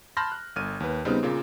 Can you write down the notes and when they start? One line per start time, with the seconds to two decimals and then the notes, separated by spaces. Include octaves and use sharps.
0.17 A5 B5 C6 F6 G6 A#6
0.32 F#6
0.56 G1 F6 D#7
0.80 D#2 B4
1.05 C#3 G3 B3 C4 D#4
1.23 A#2 C#3 A#3 F4